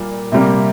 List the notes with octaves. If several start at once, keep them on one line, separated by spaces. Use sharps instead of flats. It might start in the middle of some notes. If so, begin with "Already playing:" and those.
Already playing: A#2 G3 A#3
C3 G3 A#3